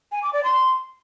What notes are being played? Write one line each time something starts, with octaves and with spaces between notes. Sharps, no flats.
G#5
D6
D5
C6